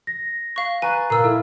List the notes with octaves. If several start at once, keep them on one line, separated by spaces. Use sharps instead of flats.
A#6
F5 C#6
B4 G#5 A#5 C#6 F#6 A6
A#2 A#4 F5 A#5 E6 F6
E4 A4